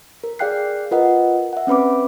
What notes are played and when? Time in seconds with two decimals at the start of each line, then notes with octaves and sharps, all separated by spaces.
0.24 A#4
0.39 G#4 D5 F5 G5 F#6 C7
0.91 F4 A#4 B4 D#5 F#5
1.53 E5 F#5
1.67 C4 C#4 B4 B5 D6